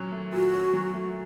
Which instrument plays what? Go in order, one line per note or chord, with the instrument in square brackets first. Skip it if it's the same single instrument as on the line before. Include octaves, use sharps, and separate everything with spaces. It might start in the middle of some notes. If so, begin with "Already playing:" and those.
Already playing: [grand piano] A#2 F#3 C#4
A3
[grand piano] A#2 [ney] F#4
[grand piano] C#4
F#3
A3